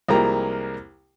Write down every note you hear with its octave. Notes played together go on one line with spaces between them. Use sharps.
C2 F3 G#3 A#3 G4 A#5